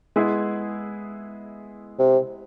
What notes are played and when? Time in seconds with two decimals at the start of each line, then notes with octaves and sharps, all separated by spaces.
0.16 G#3 B3 E4 G#4
1.99 C3